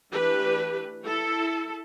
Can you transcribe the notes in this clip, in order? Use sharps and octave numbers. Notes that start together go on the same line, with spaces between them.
E3 A3 D4 G4 B4
E4 A4